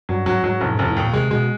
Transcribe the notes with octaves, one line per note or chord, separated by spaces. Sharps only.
G2 F#3
G#2 F#3
G#2 F#3
F1 A2
F1 G#2
A2
D#2 A#2
C3 G#3
B2 G#3